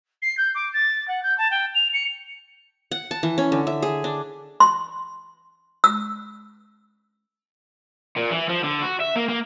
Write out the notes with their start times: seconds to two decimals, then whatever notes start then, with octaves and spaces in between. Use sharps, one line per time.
0.22 C7
0.37 G6
0.54 D6
0.73 A6
1.07 F#5
1.23 G6
1.37 A5
1.50 G5
1.74 F7
1.93 C#7
2.91 F#5
3.11 A5
3.23 E3
3.38 C#4
3.52 D3
3.67 E5
3.82 G#4
4.04 D4
4.60 C6
5.84 E6
8.17 A#2
8.31 E3
8.49 F3
8.64 D3
8.82 F#4
9.00 E5
9.16 A#3
9.29 A#3